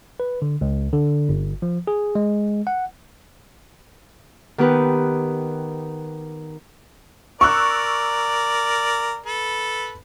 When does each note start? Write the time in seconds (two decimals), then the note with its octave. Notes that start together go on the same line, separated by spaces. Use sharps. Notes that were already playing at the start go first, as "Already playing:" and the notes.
0.20 B4
0.42 D3
0.61 C#2
0.93 D3
1.29 G1
1.62 F3
1.87 G#4
2.15 G#3
2.67 F#5
4.58 D#3 B3 G4 B4
7.41 A#4 D5 C#6 E6 F#6
9.26 A4 B4